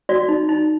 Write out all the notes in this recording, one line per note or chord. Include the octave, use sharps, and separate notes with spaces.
F#4 D5
D#4
D#4